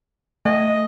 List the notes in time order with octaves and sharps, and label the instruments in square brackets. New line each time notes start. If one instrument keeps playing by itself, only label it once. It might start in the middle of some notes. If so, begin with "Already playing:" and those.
[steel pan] A3 [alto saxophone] D#5